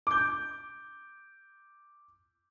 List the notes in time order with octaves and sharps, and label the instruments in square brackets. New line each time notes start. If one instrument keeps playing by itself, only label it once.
[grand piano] D6 G6